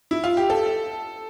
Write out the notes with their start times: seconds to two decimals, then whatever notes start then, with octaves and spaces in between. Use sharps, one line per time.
0.11 E4
0.24 F4
0.37 G4
0.50 A4